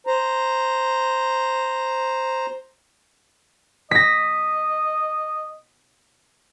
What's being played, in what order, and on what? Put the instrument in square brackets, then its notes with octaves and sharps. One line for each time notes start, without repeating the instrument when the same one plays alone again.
[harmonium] C5 A#5
[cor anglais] D#5 [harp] A#6 B6